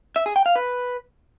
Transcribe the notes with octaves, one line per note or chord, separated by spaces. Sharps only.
E5
G#4
G5
F5
B4